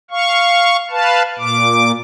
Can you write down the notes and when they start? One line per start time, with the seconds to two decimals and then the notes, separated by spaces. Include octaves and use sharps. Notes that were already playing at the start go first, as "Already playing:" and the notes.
0.11 F5 C#6
0.90 B4 F5 A5
1.39 A#2 D6